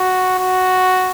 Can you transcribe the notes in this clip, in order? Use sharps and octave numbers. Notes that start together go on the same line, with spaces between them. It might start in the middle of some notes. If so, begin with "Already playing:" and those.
Already playing: F#4
F#4